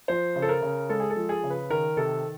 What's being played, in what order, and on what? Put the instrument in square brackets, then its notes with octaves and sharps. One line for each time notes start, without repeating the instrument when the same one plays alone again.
[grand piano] F3 C5
C#3
A4
A#4
C#3
G#3 A4
G#4
A4
F3
G#4
C#3
B4
D#3 A#4
C3 A4